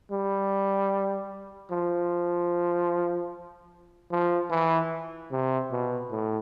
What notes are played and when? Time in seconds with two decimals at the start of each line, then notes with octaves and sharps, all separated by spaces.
0.11 G3
1.71 F3
4.11 F3
4.50 E3
5.31 C3
5.71 B2
6.11 A2